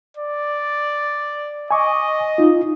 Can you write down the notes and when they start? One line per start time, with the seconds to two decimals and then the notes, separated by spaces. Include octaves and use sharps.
0.17 D5
1.71 D#5 G#5 C#6 D6
2.38 D#4 F4